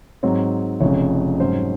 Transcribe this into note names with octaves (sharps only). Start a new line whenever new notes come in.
G#2 F#3 C4 C#5
F1 F2 C#3 C#5
G#2 F#3 C#4 C5